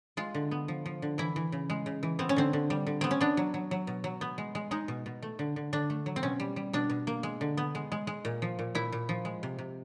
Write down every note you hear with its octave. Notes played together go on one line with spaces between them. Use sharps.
G#3 F4
D3
B3
F3
F3
D3
E3 E4
E3
C#3
G#3
C#3
E3
B3 C4
C#4
D3 C4
D3
G3
D3
B3 C4
C#4
B3 D4
F#3
F#3
F#3
B2
F#3
B3
G#3
G#3
G#3 D#4
B2
B2
A3
D3
D3
D3 D4
A3
F#3
C4
B2 C#4
G3
G3
B2 D4
B2
A#3
G#3
D3
B3
G#3
G#3
G#3
A#2
F3
A#2
A#2 E4
A#2
F3
G#3
C3
C3